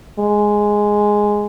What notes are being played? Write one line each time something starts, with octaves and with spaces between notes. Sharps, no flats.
G#3